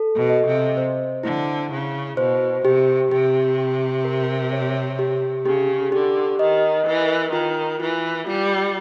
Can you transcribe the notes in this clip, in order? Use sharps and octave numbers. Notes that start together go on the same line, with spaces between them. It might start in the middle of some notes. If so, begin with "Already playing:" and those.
Already playing: A4
B2
D#5
C3
C5
D3 E4
C#3 E4
B2 C5
C3 G4
C3 G4
G4
A#4
C#5
G4
C#3 G4
D3 G4
D#3 D#5
E3 A#4
D#3 F4
E3 F4
G3 F4